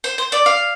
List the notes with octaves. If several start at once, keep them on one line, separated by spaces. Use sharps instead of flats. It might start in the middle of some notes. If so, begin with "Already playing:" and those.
C5
C5
D5
F5